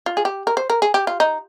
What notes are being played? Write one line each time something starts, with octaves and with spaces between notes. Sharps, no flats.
F4
G#4
G4
A#4
C5
A#4
G#4
G4
F4
D#4